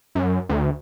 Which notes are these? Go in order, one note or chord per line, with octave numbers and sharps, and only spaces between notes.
F#2
D2